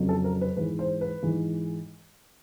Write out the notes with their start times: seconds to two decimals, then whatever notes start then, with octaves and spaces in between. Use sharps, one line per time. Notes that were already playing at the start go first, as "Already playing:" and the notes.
Already playing: F2 C#3 F#3
0.09 A4
0.24 A#4
0.41 B4
0.57 G#2 E3 G#3 B4
0.79 C5
1.01 B4
1.23 G#2 E3 G#3